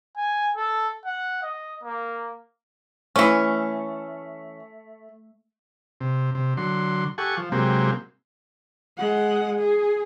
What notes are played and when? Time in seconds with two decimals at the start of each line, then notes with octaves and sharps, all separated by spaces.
0.17 G#5
0.56 A4
1.05 F#5
1.43 D#5
1.84 A#3
3.16 E3 A3 C#4
6.01 C3
6.35 C3
6.57 D3 F#3 C6
7.18 G4 A4 F#5 G#5 C#6
7.37 F3
7.52 C3 F#3 G#3 A#3 C4 G4
8.98 G#3 F#5
9.59 G#4